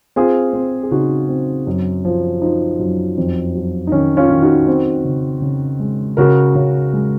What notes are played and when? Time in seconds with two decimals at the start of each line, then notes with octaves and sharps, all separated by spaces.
0.16 C4 F4 G#4
0.53 C4
0.83 G#4
0.91 C#3 D#4 F#4
1.29 C4
1.67 F#2
2.05 F3
2.41 F3 D#4
2.79 F#2
3.18 F2
3.55 F#3
3.87 D#4
3.92 D#3 C#4
4.17 C#4 F4
4.30 D#3
4.42 D#4 F#4
4.67 C4
5.04 C#3
5.42 C#3
5.80 G#3
6.17 C#3 F#4 A#4
6.55 C#3
6.93 G#3